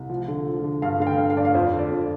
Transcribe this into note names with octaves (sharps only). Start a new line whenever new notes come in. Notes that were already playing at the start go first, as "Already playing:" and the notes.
Already playing: C2
F3
D3
F3
D3
G2 F5
D3 F5
G5
G2
F5
G2 D5
F5
F2 C5
D3
D5
F2